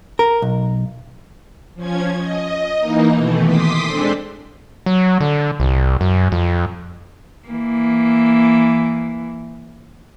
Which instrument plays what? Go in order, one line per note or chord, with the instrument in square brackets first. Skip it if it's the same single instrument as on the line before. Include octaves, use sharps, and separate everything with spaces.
[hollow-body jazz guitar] A#4
B1
[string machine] F3 C#4 G#6
D#5
E3 A#3 D#4
B2 D#3 E3 A3
C6 D6 D#6 B6
G#3 C4 D4 A4
[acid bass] F#3
D3
C2
F#2
F2
[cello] E3 A#3